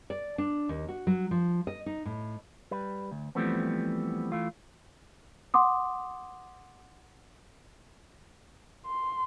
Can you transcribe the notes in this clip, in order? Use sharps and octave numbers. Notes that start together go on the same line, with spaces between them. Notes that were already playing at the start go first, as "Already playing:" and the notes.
D5
D4
D#2
F#4
F#3
F3
D#5
D#4
A2
G3 B4
D2
E3 F3 G3 A3 B3 C4
E3 A3 F4
F#5 C6 D6 D#6
C6